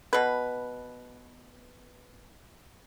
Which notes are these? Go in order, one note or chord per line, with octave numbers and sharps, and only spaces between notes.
B2 B4